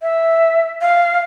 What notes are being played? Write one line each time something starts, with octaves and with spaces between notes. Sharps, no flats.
E5
F5